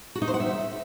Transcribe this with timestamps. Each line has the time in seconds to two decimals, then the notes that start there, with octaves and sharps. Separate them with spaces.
0.15 F#4
0.22 D#4
0.28 C5
0.34 F#5
0.40 E5